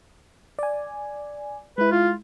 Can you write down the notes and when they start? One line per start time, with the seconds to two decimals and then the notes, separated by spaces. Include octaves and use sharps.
0.59 D5 G#5
1.78 G#3 E4 B4
1.91 F4